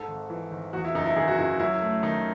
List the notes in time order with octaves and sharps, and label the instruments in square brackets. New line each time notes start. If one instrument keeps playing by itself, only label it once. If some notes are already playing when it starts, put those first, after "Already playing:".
Already playing: [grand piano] G#2 A4
G#1
E3
G#1
E2 F#4
E4
F#1 D#4
E4
D#3 G#4
F#4
F#1 E4
F#2 E4
A3
D#3 D#4